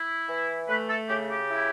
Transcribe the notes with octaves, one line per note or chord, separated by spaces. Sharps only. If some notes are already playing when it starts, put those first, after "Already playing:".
Already playing: E4
E3
A3 B4
A4
C#3 G4
G4
E4